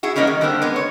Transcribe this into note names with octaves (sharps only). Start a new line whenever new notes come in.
E4 F#4 G#4
G3 G#3 A#3 C#4 D#4 E4
D#3
D3 G3 A#3 C4
G#3 B3
C#5